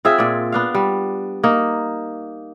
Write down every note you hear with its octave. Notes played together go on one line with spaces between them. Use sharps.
C4 F4 G#4 E5
A#2 D5
B3 D4 F5
G3
A#3 D#4